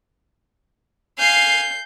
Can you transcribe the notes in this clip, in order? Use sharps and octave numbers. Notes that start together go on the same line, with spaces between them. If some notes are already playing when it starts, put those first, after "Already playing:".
F5 G#5 G6 C7